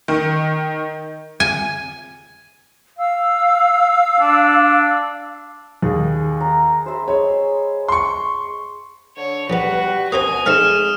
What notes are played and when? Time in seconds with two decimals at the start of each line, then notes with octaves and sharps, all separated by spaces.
0.08 D#3
1.40 G#5
2.98 F5 E6
4.20 D4
5.82 D#2 G#4 D#5
6.41 A#5
6.86 C5 E5 B5
7.08 G#3 C#5 E6
7.88 C6 C#6
9.17 D3 C#5
9.50 A#1 G3 B3 F#4 B4
9.81 G4
10.12 B2 A#3 C4 C5 G#5 D#6
10.46 G#3 A3 C4 D#4 F6 E7